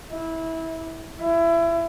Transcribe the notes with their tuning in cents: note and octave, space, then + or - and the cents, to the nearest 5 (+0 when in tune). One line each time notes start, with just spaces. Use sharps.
E4 -20
E4 +25